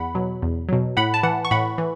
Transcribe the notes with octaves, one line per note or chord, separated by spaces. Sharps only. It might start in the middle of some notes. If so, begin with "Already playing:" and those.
Already playing: E2 F#5 B5
B2 F#3
E2
B2 F#3
A2 F#5 B5
A5
E3 F#5
C#6
A2 F#5 B5
E3